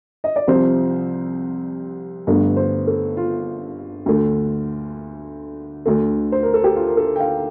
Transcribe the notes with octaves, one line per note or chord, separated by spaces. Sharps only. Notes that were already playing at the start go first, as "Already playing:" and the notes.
D#5
D5
C2 C3 F3 C5
G1 G2 D3 A3
C5
A4
F4
D2 D3 A3
D2 D3 A3
C5
A#4
A4
G4
F4
A#4
A4
G5
F5